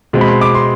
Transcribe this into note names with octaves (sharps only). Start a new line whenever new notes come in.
B2 G#3 C4
B5
C6
D6
C6